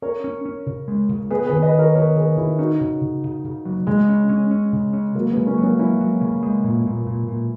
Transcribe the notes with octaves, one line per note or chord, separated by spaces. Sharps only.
C#4 A#4 C#5
C#4
C#4
C#3
G#3
C#3
B3 G#4 B4
G#4 B4
D#3
B4 D#5
D#3
A#4 C#5
B3 A#4 C#5
D#3 G#4 B4
D#3 E4 G#4
C#4 D#4 F#4
C#3
C#3
C#3
C#3
F#3
C#3 G#3
C#4
C#4
C#4
C#3
C#4
C#3 F#3 A#3
G#3 B3
C#3
A#3 C#4
F#3
A#3 C#4
F#3 C#4 E4
F#3
C#3
G#3
A#2
A#2
A#2
A#2